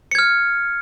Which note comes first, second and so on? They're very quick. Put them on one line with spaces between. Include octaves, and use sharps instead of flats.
C#7 G#6 F6